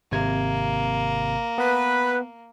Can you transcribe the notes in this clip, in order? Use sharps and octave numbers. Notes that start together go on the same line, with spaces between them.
G#1 C3 A#3 G#6
B3 B4